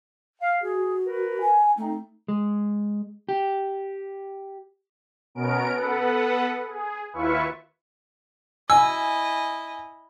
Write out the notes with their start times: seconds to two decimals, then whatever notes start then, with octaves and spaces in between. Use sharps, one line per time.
0.42 F5
0.62 F#4 G#4
1.06 A#4 B4
1.41 G#5
1.78 A3 C4 D#4
2.28 G#3
3.29 G4
5.35 B2 B3 C#4 A#4 D7
5.74 B3 A4 B4 F#5
6.67 G#4
7.13 D#2 E4 F4 B4 E5 C#6
8.70 E4 D#5 G#5 E6